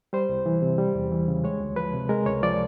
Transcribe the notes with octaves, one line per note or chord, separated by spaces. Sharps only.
G3 C5
C2
E3
C3
G3
E2
E3
C#3
G#3 C#5
D2
F3 B4
C3
G#3 A#4
C#2 C#5
F3 D5